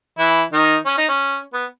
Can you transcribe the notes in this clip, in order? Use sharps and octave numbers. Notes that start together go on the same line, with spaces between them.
E3 E4
D#3 D#4
C#4
D#4
C#4
B3